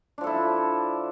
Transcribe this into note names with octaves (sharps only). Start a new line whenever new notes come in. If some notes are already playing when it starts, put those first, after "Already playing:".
F3 D4 E4 A4